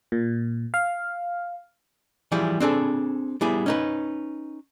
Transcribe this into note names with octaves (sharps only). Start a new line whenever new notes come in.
A#2
F5
E3 F3 G3 E4 G#4
C4 D4 G#4 A4
G3 B3 E4 G#4
C#4 D#4 B4